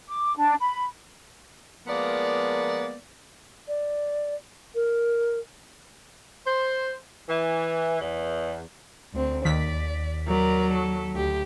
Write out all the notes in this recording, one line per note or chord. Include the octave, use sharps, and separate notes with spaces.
D6
D4
B5
F3 G#3 A#3 B3 A#4 D5
D5
A#4
C5
E3
E2
D2 C4
D#2 D5 B6
F#3 A#4 D5
A4
D2 G4